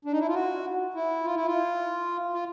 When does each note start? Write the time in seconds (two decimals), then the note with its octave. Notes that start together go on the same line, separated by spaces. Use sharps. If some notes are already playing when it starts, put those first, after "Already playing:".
0.05 D4
0.12 D#4
0.19 E4
0.27 F4
0.34 F#4
0.94 E4
1.24 F4
1.35 E4
1.46 F4
2.33 F4